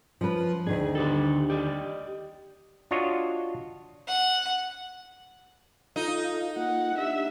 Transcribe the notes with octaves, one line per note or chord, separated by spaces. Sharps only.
F3 C#4 B4
D2 D#3 D4 G#4
D3 G4 A4
G4 D5 D#5
D4 F4 F#4 C#5 D#5
F#5
D#4 F4 A4 F5
A#3 F4 F#5
D4 G4 E5